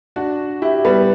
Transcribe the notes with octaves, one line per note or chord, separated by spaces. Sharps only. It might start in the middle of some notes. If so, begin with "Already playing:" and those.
D4 F#4
E4 G4
G3 B3